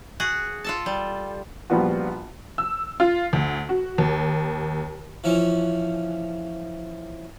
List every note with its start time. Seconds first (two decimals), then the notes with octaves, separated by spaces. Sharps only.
0.20 F#4 G#4 F#5
0.64 F4 A4 A5
0.86 G3
1.70 A#1 F3 G3 B3 F4 F#4
2.58 E6
3.00 F4
3.33 D2
3.69 F#4
3.98 D#2
5.24 E3 F3 C#4